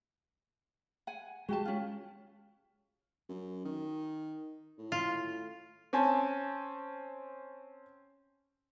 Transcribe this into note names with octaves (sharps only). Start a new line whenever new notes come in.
F#5 G#5
G#3 F#4 G4 A5
C#4 F4
F#2
D#3
A2
F4
C4 C#4 G#5 A5